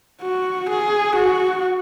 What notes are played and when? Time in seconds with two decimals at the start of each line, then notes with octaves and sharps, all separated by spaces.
0.22 F#4
0.69 G#4
1.16 F#4